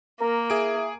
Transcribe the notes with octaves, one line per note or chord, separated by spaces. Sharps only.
A#3 A#4
E4 G#4 D7